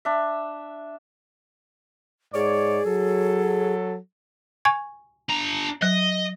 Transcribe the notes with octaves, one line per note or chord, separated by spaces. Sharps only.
D4 E5
G#2 G#4 C#5 D5
F#3 A4
G#5 C#6 G#6
D4 A#5
F#3 D#5